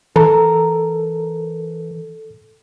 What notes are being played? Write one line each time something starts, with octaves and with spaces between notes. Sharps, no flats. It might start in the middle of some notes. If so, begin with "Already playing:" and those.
E3 A4 A#4